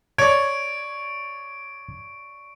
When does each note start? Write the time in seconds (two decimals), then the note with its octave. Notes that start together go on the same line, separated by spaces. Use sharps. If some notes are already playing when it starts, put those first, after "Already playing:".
0.18 C#5 D5 G#6 D7